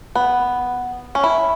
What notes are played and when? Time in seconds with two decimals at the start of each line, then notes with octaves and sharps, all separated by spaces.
0.15 B3
1.15 C#4
1.24 E4